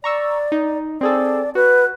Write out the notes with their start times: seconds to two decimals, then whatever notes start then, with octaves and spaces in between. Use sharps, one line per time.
0.04 D5 A#5 C#6 E6
0.52 D#4
1.01 C4 G#4 A4 D5
1.55 F#4 B4